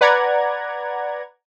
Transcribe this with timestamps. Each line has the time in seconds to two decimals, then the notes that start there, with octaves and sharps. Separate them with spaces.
0.01 B4 D5 F#5 A#5 G#6